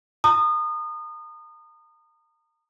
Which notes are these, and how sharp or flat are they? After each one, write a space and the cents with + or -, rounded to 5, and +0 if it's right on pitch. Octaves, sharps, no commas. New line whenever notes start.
A#5 -40 D#6 -30